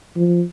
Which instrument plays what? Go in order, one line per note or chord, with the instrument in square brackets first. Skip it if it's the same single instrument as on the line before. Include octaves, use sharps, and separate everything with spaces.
[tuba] F3